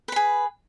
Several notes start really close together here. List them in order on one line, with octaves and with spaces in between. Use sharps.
B4 B5 G#4